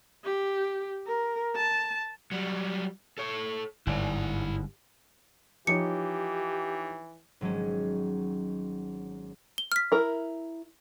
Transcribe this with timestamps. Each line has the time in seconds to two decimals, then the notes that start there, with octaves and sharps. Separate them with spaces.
0.25 G4
1.07 A#4
1.56 A5
2.32 F#3 G3
3.18 A4 C#5
3.87 G1 G#2 E4 D5
5.67 E3 F3 D#4 G4 C#5 C#7
7.41 G#1 F#3 G#3 C#4
9.58 G7
9.72 F6 B6
9.92 E4 A#4